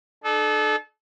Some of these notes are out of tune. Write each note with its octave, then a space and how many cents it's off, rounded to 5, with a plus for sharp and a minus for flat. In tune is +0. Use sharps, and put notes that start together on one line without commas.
D4 +45 A4 -30